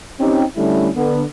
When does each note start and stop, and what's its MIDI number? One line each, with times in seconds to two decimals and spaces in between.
0.18 0.43 60
0.18 0.43 61
0.18 0.43 63
0.18 0.43 67
0.56 0.89 50
0.56 0.89 55
0.56 0.89 57
0.56 0.89 61
0.56 0.89 64
0.95 1.22 50
0.95 1.22 59